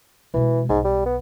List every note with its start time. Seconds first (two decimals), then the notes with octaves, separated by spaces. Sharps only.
0.34 B2 E3 G#3
0.69 B1 G#2
0.84 G3
1.05 B3